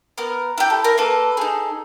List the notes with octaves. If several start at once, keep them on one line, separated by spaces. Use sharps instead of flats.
B3 A#4
E4 G4
A4
A#4
A#3 A4 B4
D#4 G#4